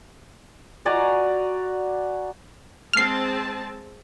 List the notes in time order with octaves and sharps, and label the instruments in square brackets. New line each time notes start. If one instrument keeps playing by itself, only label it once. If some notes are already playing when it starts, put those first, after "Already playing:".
[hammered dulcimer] F#4 D5 G#5 A#5
[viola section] G#3 C4 A5 [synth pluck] F6 C7